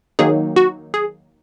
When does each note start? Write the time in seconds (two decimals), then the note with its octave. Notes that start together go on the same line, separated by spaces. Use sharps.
0.19 D#3 F#3 A#3 D#4 G#4
0.56 F#4
0.94 G#4